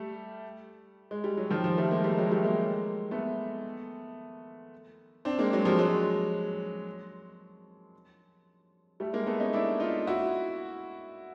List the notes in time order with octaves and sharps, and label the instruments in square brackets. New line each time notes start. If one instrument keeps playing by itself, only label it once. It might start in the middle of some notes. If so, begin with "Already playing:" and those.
Already playing: [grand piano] G3 A3
G#3
G3
F#3
D#3 F3
F3 G3
G3 A3
G#3 A#3
G3 A3
F#3 G#3
G3 A3
G#3 A#3
A3 B3
C4 D4
G#3 A#3
F#3 G#3
F3 G3
F#3 G#3
G3 A3
G#3 A#3
A3 B3
C#4 D#4
D4 E4
D#4 F4
E4 F#4